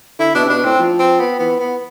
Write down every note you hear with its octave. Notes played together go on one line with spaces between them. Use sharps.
D3 E4
B2 D4
C3
B2 D4
A2 C4
F3
C4
B3
E3 B3
B3